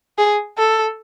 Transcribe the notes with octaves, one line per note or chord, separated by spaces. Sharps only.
G#4
A4